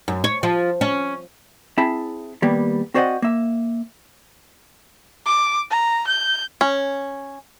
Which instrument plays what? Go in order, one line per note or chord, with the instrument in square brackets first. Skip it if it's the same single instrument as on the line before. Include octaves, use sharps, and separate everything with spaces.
[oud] F#2
C#5
F3
C#4
[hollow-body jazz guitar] C4 E4 G#4 A5 B5
D#3 G3 A#3 B3
C4 F#4 C5 D5 D#5 F#5
A#3 E5
[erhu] D6
A#5
G6
[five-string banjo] C#4